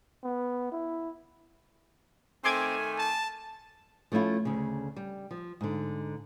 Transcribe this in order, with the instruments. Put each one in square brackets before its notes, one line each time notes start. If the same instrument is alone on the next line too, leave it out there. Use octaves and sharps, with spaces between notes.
[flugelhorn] B3
E4
[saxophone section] D#3 A3 [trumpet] C4 [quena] G#5 [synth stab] C6 D6 G#6
[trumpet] A5
[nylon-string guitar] F3 A3 C#4 E4 F4
D2 C#3
G3
F3
G#2 D3